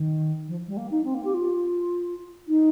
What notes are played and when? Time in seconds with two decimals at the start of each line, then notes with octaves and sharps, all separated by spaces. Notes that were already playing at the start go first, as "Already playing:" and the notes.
Already playing: D#3
0.48 F3
0.68 G3
0.77 A#3
0.91 D#4
1.05 C4
1.14 A#3
1.25 G4
1.34 F4
2.48 D#4